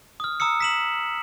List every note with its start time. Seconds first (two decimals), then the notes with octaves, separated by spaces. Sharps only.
0.20 D#6 F6
0.40 A#5 D#6 E6 C#7
0.60 B6 E7 F#7